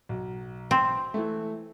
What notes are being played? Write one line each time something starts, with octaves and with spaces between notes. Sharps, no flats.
B1
C4
E3 A3